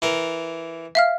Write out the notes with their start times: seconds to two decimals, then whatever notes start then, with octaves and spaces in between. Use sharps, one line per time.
0.02 E3 A#4
0.95 E5 F5 F6